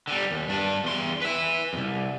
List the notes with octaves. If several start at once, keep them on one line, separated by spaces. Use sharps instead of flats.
D3 G3
D#2
G2 D4
E2 C6
B4 E5
C2 F2